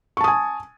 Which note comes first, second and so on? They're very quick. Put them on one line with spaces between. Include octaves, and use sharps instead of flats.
C#6 A5 D#6 G#5